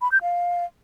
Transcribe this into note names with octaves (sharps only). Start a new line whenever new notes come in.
B5
G6
F5